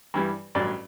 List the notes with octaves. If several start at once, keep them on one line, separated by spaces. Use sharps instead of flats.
G2 E3 G3
A1 G2 F#3 D5